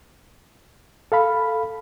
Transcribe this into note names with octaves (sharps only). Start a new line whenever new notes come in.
A4 F5 B5